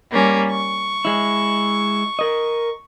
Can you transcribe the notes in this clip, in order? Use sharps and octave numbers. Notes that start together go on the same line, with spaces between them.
G3 A#3 C#4
C#6
G#3 E4
A#4 D#5